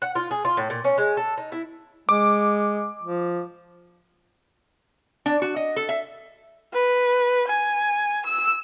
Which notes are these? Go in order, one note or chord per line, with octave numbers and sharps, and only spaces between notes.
F#5
F4
G#4
F4
A2
A#2
C#4
G#3
A4
D#4
E4
G#3 D6
F3
D4
F#4
D#5
A4
E5
B4
G#5
E6